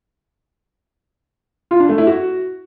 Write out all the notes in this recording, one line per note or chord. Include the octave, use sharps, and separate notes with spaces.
F4
D4
A3
E4
F#4